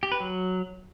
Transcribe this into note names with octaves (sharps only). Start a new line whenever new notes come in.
G4
B4
F#3